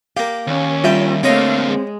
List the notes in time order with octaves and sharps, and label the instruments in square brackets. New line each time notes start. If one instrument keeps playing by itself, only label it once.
[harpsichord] A#3 G4 [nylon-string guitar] F5
[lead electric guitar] D#2 [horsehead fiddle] C#4
[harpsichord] G2 G4 G5 [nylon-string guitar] F4 E5
[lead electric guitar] D3 A#3 [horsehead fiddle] A3 F5 [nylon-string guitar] C4 [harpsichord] G4 C#5 D#5
[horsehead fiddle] G#3